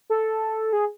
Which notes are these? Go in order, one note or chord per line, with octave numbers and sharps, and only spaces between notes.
A4
G#4